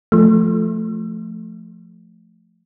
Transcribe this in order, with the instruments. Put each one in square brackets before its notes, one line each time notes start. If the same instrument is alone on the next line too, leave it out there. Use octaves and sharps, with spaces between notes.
[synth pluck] F3 A3